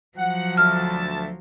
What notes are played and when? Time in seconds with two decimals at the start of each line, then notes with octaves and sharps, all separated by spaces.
0.18 F3 F#3 F#5
0.57 D2 E5 A5 F6